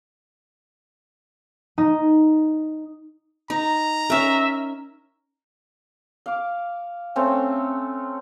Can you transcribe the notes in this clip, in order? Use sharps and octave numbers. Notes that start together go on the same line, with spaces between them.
D#4
D#4 A#5
C#4 A#4 E5
F5 D6
A3 C4 C#4